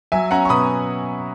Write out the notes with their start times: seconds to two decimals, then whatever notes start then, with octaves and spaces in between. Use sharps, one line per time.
0.12 F#3 E5 G#5
0.31 C#4 F#5 A#5
0.45 C#6
0.49 B2 B5 D#6